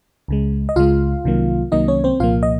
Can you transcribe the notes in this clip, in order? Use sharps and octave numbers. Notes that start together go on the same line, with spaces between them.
C#2 C#3 G#3
D#5
C#2 C#3 G#3 F4 F5
C2 C3 D#3 F#3 A#3
C2 C3 D#3 F#3 A#3 D#4 D#5
C#4 C#5
C4 C5
C2 A#2 F3 A#3 F4 F5
D#5